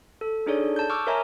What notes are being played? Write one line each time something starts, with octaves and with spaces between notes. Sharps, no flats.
A4
D4 D#4 G#4 A4 C#5 D5
A5 G6
C#6 D6 E6 F6
A#4 C#5 D#5 E5 G#5 A#5